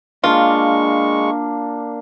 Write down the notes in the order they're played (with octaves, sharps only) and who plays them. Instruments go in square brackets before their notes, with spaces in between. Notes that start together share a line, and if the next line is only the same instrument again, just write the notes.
[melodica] G#3 C#6 [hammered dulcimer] A#3 D4 [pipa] F4